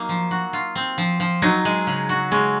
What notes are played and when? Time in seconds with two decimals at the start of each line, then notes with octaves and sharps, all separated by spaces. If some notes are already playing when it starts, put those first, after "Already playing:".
Already playing: F#3 A#3 D#4
0.09 F3
0.31 F#4
0.53 F4
0.75 C4
0.98 F3
1.20 F3
1.42 F#3 D#4
1.65 G#3
1.87 C#3
2.09 F#4
2.31 G#3 C#4